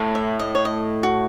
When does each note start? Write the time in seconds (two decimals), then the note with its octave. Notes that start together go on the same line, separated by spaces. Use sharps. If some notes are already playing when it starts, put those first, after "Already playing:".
Already playing: A2
0.15 E5
0.39 D#5
0.55 C#5
0.65 D#5
1.03 F#4